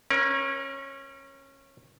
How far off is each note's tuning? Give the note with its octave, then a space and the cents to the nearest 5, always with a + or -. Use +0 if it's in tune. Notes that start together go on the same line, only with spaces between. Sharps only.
C#4 -20 A#4 +30